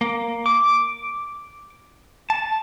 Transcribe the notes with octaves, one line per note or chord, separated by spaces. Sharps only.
A#3
D6
A5